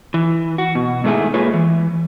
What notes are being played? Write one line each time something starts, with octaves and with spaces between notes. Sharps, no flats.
E3
F#4
B2
G#2 D#3 A3 E4 G#4
G#3 A#3 F4 G#4 B4 C#5
E3